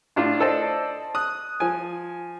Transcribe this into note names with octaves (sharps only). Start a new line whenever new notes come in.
A2 D4 F4
A4 C5 D5 D#5
D#6 F#6
F3 G#5